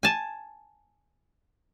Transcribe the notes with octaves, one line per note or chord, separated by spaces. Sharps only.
G#5 A5